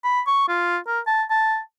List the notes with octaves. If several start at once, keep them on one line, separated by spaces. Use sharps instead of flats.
B5
C#6
F4
A#4
A5
A5